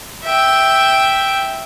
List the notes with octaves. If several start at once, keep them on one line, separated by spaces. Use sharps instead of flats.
E5 G5